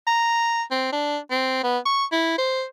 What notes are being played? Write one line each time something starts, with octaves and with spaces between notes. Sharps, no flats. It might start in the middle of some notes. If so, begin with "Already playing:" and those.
A#5
C4
D4
C4
B3
C#6
E4
C5